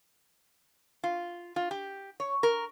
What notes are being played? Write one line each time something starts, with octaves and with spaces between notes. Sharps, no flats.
F4
F4
G4
C#5
A#4